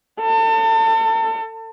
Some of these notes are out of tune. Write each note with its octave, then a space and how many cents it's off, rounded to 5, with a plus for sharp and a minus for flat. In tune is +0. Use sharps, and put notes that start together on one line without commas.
A4 +35